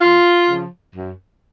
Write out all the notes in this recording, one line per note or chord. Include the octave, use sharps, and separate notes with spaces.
F2 F4
C#3 F3
F#2